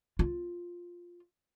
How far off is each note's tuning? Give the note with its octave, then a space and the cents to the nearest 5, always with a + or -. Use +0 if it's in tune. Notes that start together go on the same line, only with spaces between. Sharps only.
F4 +5